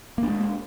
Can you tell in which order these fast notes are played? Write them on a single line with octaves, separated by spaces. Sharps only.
A#3 D4 G#3